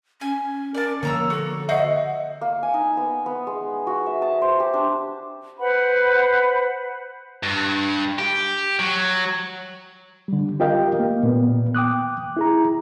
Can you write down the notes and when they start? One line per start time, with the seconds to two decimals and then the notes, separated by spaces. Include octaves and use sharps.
0.21 C#4 G#5
0.74 A#4 D5 A5
1.03 D3 F3 A#3 C#5 A#5 E6
1.30 F#4 A4
1.69 F#4 C5 D#5 E5 F#5
2.41 A#3
2.63 G#5
2.74 D#4
2.97 B3
3.26 B3
3.47 G#3
3.87 F#4
4.06 E5
4.22 A5
4.42 C5
4.60 G4
4.74 D4
5.59 B4 C5 F#5 B5
7.43 G2
8.19 G4
8.80 F#3
10.28 D3 G3
10.60 F4 G4 A#4 D#5 F5 G5
10.99 A#3
11.23 A#2 B3
11.75 G5 D6 D#6 F#6
12.37 E4 G#4 A#5